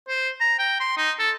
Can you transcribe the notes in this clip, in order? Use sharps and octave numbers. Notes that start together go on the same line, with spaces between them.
C5
A#5
G5
C6
D#4
A4